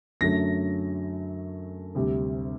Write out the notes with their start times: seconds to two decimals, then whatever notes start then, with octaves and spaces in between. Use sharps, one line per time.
0.21 F#2 D3 F#3 A3 A#6
1.95 D2 C3 G3